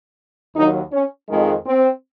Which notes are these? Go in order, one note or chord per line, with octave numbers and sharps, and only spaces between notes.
D#2 D#3 F#3 D#4
C#4
F2 D#3 G#3
C4